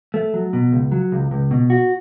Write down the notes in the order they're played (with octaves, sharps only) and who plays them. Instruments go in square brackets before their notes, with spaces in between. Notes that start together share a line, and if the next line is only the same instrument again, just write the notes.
[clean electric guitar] A3
F#3
B2
C#2
F#3
C#2
C#2
B2
F#4